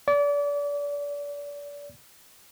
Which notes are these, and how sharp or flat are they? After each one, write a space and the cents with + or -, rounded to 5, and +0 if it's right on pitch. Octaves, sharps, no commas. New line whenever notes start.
D5 -30